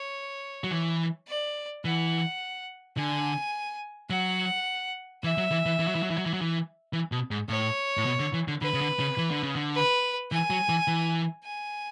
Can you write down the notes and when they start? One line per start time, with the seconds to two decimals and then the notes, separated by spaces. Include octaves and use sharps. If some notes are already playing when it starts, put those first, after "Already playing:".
Already playing: C#5
0.64 F#3
0.71 E3
1.28 D5
1.84 E3 F#5
2.97 D3 G#5
4.10 F#3 F#5
5.24 E3 E5
5.38 F#3
5.51 E3
5.66 E3
5.80 E3
5.88 F#3
5.95 E3
6.03 F#3
6.10 E3
6.18 F#3
6.26 E3
6.33 F#3
6.41 E3
6.93 E3
7.12 B2
7.31 G#2
7.49 A2 C#5
7.97 A2
8.06 B2
8.20 D3
8.34 E3
8.48 D3
8.62 D3 B4
8.74 C#3
8.81 D3
9.00 C#3
9.18 E3
9.31 D3
9.43 C#3
9.56 D3
9.75 B4
10.32 E3 G#5
10.50 F#3
10.69 E3
10.88 E3
11.44 G#5